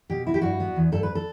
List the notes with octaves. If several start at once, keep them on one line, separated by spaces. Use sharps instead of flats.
B2 G4
E4 F#4
G4
G2 F#4
B3
E2
G2 A4
B4
A4